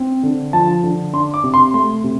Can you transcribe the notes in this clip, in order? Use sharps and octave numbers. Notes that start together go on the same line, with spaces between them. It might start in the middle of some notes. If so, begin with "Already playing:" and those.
Already playing: C4
D3
F3 A5
D3
D4 C6
D6
C3
C6
A3 C6
C3